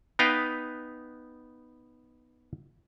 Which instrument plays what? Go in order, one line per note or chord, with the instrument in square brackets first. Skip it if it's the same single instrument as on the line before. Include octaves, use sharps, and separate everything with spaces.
[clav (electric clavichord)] B3 D#4 B4 F5 G5